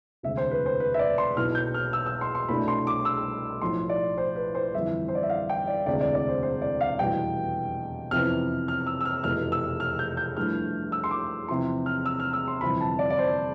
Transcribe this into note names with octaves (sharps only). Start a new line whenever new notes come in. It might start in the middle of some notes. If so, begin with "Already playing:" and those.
E1 D2 C3 E5
C5
B4
C5
B4
E5
D5
C6
B1 B2 B3 E4 F6
G6
F6
E6
E6
C6
C6
C2 B2 A3 D4 B5
C6
D6
E6
B1 A2 F3 C6
D5
C5
B4
C5
G1 F2 E3 E5
C5
D5
E5
F5
G5
D5
E1 D2 C3 D5
D5
D5
C5
C5
D5
F5
F1 E2 B2 G3 G5
F2 C3 E3 B3 F6
F6
E6
E6
F6
F1 E2 B2 F6
E6
F6
G6
G6
G2 F3 A3 E4 F6
E6
C6
D6
E2 C3 F3 C6
F6
E6
F6
E6
C6
G1 F2 C3 E3 B5
A5
D5
D5
C5